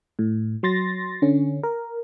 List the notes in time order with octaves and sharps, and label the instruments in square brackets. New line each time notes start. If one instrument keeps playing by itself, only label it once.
[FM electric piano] A2
F#3 C6 A6 A#6
D3 C#4
A#4